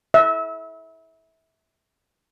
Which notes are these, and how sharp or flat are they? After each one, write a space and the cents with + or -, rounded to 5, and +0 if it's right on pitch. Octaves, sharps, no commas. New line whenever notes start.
E5 -25